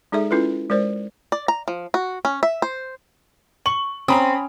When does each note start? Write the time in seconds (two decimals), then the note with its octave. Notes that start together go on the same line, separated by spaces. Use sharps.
0.12 G#3 D#4 G#4 A4 E5
0.31 C#4 E4 F4 A4 B4
0.70 G#3 A#4 C5 D5
1.32 D5
1.48 A#5
1.68 F3
1.94 F#4
2.25 C#4
2.43 E5
2.62 C5
3.66 C#6 F#7
4.08 C4 C#4 A#5 B5 D#6